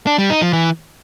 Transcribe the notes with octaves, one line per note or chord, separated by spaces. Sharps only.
D4
G3
D#4
F3
E3